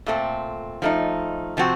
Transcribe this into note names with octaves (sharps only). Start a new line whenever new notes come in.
A#2 A3 C4
F3 A3 D#4
C3 F3 C4 F#4